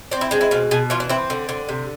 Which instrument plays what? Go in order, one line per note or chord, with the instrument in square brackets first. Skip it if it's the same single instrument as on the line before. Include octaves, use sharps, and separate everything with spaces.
[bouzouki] C4 D4
E4
G#3 D4
E4
B2 F4
B2 G#4
E3 F4
D4
C4 E4
D3
D3
C3